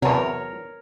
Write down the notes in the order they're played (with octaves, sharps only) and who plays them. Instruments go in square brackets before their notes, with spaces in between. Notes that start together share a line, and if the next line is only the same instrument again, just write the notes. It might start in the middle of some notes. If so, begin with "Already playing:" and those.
[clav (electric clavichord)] E2 F#3 [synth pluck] C3 A5 [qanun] A#4 C#5